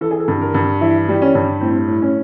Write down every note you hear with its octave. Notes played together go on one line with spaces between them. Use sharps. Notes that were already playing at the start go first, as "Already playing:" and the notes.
E3 A4
G#4
A4
G2
A#4
G2
E3 E4
G3
C#4
G2
A2 C4
A2
C#4